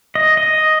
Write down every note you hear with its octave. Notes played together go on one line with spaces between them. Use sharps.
D#5
D#5